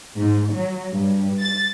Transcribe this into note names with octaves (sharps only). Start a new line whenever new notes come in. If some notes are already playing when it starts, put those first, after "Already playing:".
G#2
F#3
G2
A6